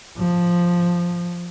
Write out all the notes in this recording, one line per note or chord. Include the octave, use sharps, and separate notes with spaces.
F3